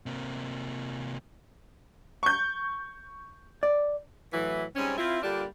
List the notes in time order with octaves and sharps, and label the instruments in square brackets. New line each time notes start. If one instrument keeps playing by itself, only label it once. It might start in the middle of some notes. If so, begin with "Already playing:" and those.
[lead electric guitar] C3 A#3
[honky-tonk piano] C#6 G6
[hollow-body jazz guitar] D5
[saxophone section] A2 E3 F#3
G#2 G3 C4 C#4
C4 E4 F4
D3 G3 A#3 D4 F4 G4